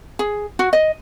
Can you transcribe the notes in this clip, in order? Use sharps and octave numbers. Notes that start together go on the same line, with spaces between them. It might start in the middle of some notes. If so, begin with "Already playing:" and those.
G#4
F#4
D#5